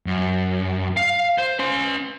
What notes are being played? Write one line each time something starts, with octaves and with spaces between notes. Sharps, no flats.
F#2
F5
C5
C#4 C6